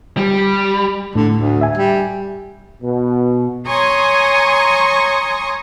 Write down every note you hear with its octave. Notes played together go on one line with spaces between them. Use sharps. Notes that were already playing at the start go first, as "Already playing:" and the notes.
G3
A2 D3
D2
E5 G#5
G3
B2
C#5 G#5 A#5 C6 C#6 D#6